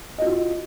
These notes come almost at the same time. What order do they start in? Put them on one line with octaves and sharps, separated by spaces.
D#5 F#4 F4